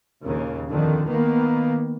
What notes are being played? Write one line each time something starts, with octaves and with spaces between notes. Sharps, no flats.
A#1 D#2 C#3
F2 D3 D#3
D#3 A#3 B3